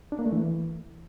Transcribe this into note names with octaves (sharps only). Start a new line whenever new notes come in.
D4
A#3
A3
E3